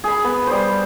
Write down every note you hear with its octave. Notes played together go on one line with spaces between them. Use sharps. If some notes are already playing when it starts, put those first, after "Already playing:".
G#4 B5
B3
G3 C5